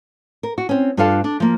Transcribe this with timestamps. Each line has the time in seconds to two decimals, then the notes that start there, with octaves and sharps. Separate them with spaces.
0.43 A#4
0.58 F#4
0.69 C4 C#4
0.97 G2 D4 F4 A4 F5 A5
1.24 D4
1.40 F3 A#3